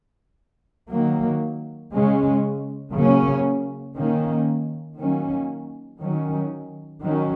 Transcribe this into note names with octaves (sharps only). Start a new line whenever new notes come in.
D#3 F#3 A#3
C#3 G#3 C#4
C#3 F#3 A#3 C#4
D#3 A#3 C#4
D#3 F#3 A#3 C#4
D#3 F#3 C#4
D#3 F#3 C#4